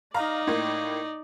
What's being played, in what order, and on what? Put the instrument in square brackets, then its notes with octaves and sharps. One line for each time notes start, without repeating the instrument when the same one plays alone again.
[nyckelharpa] D#4 D5 [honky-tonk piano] F5 A#5
[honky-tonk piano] A2 A#3